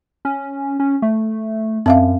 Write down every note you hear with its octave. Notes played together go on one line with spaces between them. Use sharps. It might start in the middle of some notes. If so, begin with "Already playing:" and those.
C#4
C#4
A3
F#2 C4 E5 F5